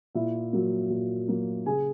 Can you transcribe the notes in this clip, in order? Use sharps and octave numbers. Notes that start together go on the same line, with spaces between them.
A#2 E4 E5
F#3 A#3
A#2
F#3 A#3
C#3 G#4 G#5